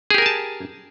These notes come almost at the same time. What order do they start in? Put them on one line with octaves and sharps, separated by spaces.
G#4 G4 A#4 G#5 A5